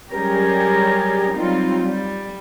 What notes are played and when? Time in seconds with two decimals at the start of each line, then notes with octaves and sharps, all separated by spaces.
0.11 F#3 G3 C#4 G4 G#4 A#4
1.33 F#3 G3 C4 D#4 F4
1.83 G3